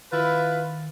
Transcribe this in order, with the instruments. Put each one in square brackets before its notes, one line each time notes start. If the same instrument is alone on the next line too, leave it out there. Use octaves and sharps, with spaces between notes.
[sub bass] D#3 [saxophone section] E4 F4 B4